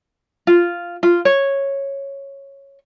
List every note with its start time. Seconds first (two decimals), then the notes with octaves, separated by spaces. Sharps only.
0.47 F4
1.03 F4
1.25 C#5